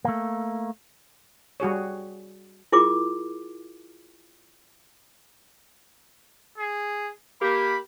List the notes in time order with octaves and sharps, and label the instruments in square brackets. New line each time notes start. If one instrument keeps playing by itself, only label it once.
[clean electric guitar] A3 A#3
[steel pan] G3 F#4 G#4 C#5
[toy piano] E4 F4 G#4 A#4 D6
[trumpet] G#4
[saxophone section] A#3 G4 [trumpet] B5